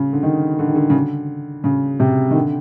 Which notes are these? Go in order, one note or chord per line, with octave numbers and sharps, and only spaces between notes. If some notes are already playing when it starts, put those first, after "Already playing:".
Already playing: C#3
D3
D#3
D3
D#3
D3
C#3
D3
C#3
C3
D#3
D3